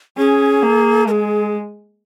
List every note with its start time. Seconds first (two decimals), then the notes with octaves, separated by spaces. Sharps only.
0.17 C#4 G#4
0.63 A#3
1.08 G#3 G#4 A#4